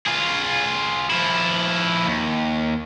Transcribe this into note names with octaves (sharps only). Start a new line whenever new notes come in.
F4 G#4
F3 E4
D#2